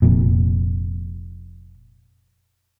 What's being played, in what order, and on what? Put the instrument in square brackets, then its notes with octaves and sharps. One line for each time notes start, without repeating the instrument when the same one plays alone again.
[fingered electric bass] F1 F2 A#2